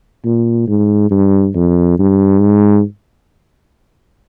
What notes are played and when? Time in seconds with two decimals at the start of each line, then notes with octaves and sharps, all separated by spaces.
0.25 A#2
0.68 G#2
1.11 G2
1.55 F2
1.99 G2
2.41 G#2